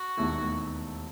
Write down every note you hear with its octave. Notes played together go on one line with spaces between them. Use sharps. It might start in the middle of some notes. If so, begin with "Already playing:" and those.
Already playing: F#4
E1 D#2 D#3 A3 E4